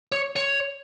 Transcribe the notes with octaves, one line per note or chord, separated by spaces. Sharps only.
C#5
C#5